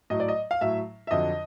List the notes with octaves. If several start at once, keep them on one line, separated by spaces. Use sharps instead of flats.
A2 F#3 D#5
D5
D#5
F5
A2 F#3 E5
E5
F2 D3 F#3 D#5